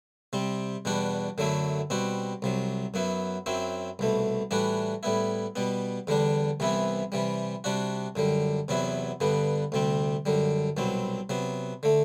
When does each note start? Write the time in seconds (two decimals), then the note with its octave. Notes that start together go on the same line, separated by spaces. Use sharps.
0.33 C3 G3 C4
0.85 E2 B2 G3 D4 F#4
1.38 F#2 D3 F#3 A3 E4
1.90 B2 G3 C4 F#4
2.42 C2 C3 F#3
2.94 F#2 F#3 B3 E4
3.46 F#2 F#3 C4 E4
3.99 C2 B2 A3
4.51 A2 E3 G3 D4 F#4
5.03 A2 G3 B3 E4
5.56 B2 G3 B3
6.07 E2 D3 G3 D4
6.60 C2 C3 E3 B3 E4
7.12 C3 E3 G3
7.64 C3 G3 D4 F#4
8.16 F#2 D3 G3
8.68 E2 C3 F#3 B3 E4
9.20 G2 D3 G3 B3
9.72 D2 C3 G3 C4
10.26 F#2 D3 G3
10.77 C2 B2 F#3 C4
11.29 C3 F#3 B3
11.83 D3 A3